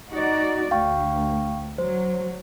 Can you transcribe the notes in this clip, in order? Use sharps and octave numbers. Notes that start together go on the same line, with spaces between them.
D#4 F#4 D5
D2 F5 G5 C#6
F#3 C5